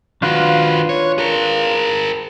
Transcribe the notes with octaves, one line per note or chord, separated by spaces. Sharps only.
D#3 D4 F4 F#4 B4
C#5
G#4 A#4